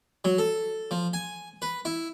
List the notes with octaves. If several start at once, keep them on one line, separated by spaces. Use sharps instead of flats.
F#3
A4
F3
G#5
B4
E4